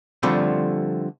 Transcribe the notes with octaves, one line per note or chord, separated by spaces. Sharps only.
D3 F3 G3 A3 C4